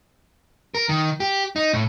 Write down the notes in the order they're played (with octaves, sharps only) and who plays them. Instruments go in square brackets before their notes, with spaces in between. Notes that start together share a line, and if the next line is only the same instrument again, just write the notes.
[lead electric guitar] A#4
D#3
G4
D#4
A2